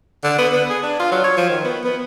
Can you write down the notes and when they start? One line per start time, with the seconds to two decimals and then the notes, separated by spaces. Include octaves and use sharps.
0.24 D3
0.39 B3
0.53 B3
0.70 G#4
0.83 D4
1.00 F4
1.12 F#3
1.24 C#5
1.37 F3
1.50 D#3
1.65 B3
1.84 B3